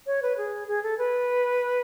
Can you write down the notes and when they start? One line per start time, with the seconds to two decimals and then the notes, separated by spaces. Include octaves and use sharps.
0.06 C#5
0.22 B4
0.38 G#4
0.68 G#4
0.83 A4
0.98 B4